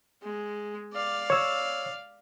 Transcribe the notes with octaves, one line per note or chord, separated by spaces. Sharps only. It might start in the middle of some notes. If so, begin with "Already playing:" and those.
G#3
D5 F5
C#5 E6